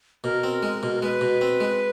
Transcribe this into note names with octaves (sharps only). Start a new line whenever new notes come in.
B2 A#4
C4
G#3
B2
A#4
G#3 B4
B2
C4
G#3